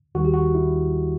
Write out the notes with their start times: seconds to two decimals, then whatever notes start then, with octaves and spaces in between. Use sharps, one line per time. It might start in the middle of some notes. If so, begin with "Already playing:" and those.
0.15 D#2 D#3 G3 F#4
0.25 G4
0.34 F#4
0.55 E4